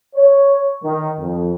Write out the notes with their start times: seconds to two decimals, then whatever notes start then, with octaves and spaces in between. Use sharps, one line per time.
0.15 C#5
0.83 D#3
1.20 F2